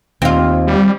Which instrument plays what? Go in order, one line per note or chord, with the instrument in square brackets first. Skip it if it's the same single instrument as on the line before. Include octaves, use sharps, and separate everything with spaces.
[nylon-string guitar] D#2 [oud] C4 F4
[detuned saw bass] G3